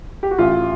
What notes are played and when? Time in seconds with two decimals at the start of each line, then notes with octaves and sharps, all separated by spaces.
0.23 G4
0.31 F#4
0.38 A1 F4